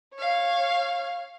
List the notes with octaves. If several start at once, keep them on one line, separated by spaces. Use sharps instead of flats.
C#5 F5